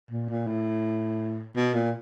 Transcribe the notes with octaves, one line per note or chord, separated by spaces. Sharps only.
A#2
A#2
A2
B2
A#2